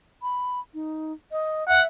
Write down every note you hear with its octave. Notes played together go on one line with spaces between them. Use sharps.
B5
D#4
D#5
E5 F#5